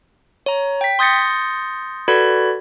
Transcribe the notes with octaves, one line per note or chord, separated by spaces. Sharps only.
C#5 A#5
G5 B6
C6 D#6 G6 A6 A#6 C#7
F#4 A4 B4 D5 B5 G#6